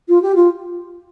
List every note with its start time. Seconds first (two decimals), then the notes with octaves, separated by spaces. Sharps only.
0.08 F4
0.22 G4
0.35 F4